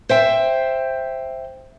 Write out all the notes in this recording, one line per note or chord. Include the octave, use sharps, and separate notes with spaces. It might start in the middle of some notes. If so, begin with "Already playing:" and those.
C5 E5 G5